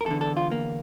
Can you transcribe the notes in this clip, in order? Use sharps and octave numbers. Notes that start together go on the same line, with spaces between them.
A#4
E2 D3 A4
A4
F4
A#3